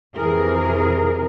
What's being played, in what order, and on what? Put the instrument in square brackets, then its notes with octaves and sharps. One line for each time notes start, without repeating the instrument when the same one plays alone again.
[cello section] F2 C3 E3 G#4 A#4